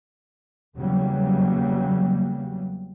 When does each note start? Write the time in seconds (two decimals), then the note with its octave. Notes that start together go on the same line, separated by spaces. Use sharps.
0.76 E2 C#3 F#3 G3 A#3